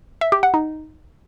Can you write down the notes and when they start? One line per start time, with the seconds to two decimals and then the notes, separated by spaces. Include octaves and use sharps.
0.21 E5
0.32 G4
0.43 F#5
0.54 D#4